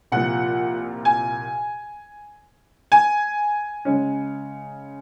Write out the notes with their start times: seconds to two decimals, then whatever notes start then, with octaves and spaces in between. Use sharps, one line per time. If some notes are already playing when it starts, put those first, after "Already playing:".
0.12 C2 A#2 F3 F#5
1.05 G#5
2.92 G#5
3.85 C#3 G#3 C#4